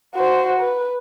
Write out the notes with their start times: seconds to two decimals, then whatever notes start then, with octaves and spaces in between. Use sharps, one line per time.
0.15 F#4 C5
0.60 B4